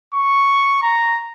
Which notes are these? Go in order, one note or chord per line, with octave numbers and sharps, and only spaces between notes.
C#6
A#5